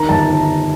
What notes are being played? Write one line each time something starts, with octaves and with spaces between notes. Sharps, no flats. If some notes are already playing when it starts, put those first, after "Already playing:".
Already playing: D#3 A#5
G1 A5